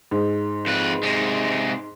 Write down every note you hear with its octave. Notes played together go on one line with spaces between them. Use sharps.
G#2
F2 B4
C3 G#3